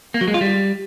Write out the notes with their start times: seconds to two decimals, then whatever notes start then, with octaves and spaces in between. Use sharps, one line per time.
0.14 A#3
0.21 F#3
0.28 G#3
0.34 F4
0.41 G3